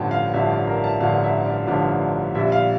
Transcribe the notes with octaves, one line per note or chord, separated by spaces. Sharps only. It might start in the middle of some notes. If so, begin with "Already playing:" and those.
Already playing: A1 G2 D3 F3 G5 A5
F5
A1 G2 D3 F3 E5
D5
A#4
A5
A1 G2 D3 F3 F5
E5
D5
A1 G2 D3 F3 D5
A#1 A#2 G3 E5
F5